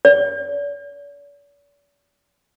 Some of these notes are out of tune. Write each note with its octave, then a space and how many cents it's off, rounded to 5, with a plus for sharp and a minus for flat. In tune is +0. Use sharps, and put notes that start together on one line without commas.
D5 -45